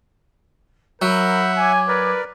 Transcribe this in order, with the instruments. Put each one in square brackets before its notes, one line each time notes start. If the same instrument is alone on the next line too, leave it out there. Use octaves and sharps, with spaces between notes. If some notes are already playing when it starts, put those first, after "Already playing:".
[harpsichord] F#3 [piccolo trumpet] A#4 [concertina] E5 F#5 [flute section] B5 G6
[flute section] C#5 D6 [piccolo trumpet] G#5
[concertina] A#4 D5 [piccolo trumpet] B4